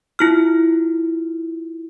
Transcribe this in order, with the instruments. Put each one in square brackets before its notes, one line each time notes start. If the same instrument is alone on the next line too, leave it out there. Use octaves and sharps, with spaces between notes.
[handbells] E4 F4 F6